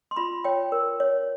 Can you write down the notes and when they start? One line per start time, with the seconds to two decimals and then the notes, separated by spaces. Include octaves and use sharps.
0.11 C6
0.16 F4 B5
0.44 C#5 G5
0.72 A#4
1.00 C#5